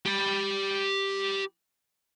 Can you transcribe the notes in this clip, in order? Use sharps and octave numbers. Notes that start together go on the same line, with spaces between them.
G4 B5